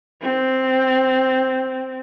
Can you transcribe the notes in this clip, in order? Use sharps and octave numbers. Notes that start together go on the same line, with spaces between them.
C4